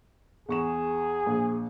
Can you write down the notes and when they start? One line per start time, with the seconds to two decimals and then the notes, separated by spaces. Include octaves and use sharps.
0.49 E2 G#4 C#6 E7
1.26 A#1